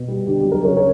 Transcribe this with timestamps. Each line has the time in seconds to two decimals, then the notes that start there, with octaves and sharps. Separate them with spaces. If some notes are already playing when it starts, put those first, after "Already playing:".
Already playing: B2
0.08 G3
0.27 D3 G4
0.40 G4
0.45 F#3
0.52 A#4
0.64 C#3 A#4 C#5
0.77 A#4 C#5